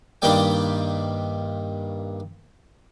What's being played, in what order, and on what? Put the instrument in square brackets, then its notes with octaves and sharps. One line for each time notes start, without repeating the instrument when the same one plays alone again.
[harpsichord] G2 D#3 G3 A#3 D5 G5